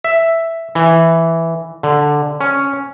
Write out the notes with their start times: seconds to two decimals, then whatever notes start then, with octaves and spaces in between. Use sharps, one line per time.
0.04 E5
0.75 E3
1.83 D3
2.41 C#4